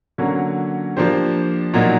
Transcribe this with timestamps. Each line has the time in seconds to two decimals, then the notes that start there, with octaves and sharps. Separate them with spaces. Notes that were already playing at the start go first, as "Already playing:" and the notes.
0.18 D3 F#3 A#3 C#4
0.97 F3 A#3 D4 G4 C5
1.74 A#2 F#3 A#3 D#4